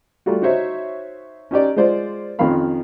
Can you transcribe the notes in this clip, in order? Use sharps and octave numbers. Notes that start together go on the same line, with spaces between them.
G3 A3 F4 F#4
D#4 F#4 C5 C#5 E5
C#4 D#4 G4 D5
G#3 F4 C5 D5
F2 D#3 F3 C#4 F5 B5